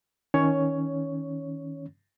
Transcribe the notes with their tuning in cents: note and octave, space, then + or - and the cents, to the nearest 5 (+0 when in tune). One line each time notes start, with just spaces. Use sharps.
D#3 +25 C#4 +0 C#5 +10